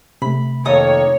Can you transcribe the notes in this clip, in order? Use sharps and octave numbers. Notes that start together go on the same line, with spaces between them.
C3 A3 B5
F2 D#3 A#3 D#4 A4 C#5 D#6